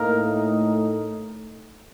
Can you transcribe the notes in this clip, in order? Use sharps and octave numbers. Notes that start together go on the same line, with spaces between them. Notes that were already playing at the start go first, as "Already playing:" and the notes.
Already playing: A2 A3 A#3 D#4 A#4